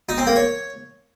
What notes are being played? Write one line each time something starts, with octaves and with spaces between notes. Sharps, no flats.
D#4
C4
A#3
C#5